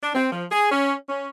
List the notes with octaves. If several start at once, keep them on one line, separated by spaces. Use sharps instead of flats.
D4
C4
F3
G#4
C#4
C#4